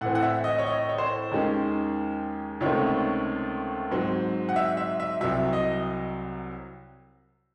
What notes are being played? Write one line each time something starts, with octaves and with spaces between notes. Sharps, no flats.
A2 E3 C4 F#5
F#5
E5
D#5
C#5
D#5
C#5
C5
D#2 D#3 G#3 C#4
C#2 C3 D#3 A3 C4 C#5
G#2 F#3 C4
F#5
E5
E5
E5
C2 C3 F#3 E5
D#5